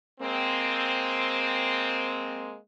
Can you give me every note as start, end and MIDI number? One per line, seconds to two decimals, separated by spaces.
0.19 2.55 56
0.19 2.55 58
0.19 2.55 60